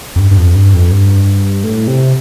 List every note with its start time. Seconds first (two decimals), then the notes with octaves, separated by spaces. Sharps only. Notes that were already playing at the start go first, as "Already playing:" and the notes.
0.16 F2
0.19 G2
0.31 G2
0.37 F2
0.56 G2
0.74 F2
0.91 G2
1.64 A2
1.87 C3